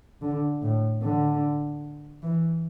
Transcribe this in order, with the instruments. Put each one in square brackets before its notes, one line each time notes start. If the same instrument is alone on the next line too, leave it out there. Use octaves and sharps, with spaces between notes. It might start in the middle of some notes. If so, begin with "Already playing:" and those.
[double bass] D3
A2
D3
E3